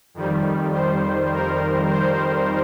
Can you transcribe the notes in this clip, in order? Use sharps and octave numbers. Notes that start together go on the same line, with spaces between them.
F2 D#3 G3
C5
A#4
C5